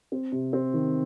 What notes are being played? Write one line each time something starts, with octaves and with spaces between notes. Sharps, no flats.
C4
C3
C4
D#3